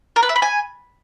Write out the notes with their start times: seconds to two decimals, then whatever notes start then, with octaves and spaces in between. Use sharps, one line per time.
0.16 A#4
0.23 B4
0.29 E5
0.36 B5
0.42 G#5